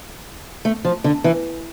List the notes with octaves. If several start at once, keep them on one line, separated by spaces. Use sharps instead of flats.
A3
F3
D3
E3